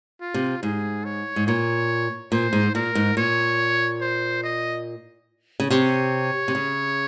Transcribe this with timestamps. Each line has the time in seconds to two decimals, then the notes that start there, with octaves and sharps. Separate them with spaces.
0.21 F4
0.34 C3
0.63 G#2 G#4
1.05 C#5
1.36 G#2
1.47 A#2 C#5
2.32 A#2 C5
2.53 G#2
2.75 A#2 A#4
2.95 G#2
3.17 A#2 C#5
4.01 C5
4.44 D#5
5.60 C#3
5.70 C3 C#5
6.48 C3
6.55 C#3